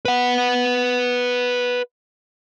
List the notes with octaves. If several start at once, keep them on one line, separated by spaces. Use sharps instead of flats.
B4 F#5